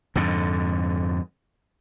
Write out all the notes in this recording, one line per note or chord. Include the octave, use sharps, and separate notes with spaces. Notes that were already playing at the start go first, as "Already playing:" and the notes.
F2 G#2 D3